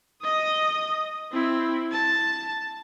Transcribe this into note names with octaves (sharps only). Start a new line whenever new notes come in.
D#5 D#6
C4 E4
A5